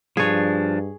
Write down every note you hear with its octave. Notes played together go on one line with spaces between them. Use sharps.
G2 F3 D4 G#4 C#5